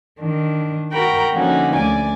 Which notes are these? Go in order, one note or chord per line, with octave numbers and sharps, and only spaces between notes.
D#3 D4
F#4 A#4 G5 A#5 B5
D3 F3 A#3 C#4 D#4 F#4
D2 D5 G#5